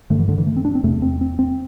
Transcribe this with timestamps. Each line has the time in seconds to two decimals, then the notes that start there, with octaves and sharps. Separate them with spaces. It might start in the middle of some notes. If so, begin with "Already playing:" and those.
0.10 G2 D3 A3
0.19 E3
0.29 D3
0.38 E3
0.46 A3
0.56 C4
0.65 D4
0.75 C4
0.83 E2 C3 A3
1.02 C4
1.21 C4
1.39 C4